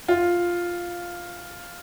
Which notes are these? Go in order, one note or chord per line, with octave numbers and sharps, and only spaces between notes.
F4